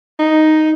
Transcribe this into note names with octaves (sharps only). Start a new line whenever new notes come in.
D#4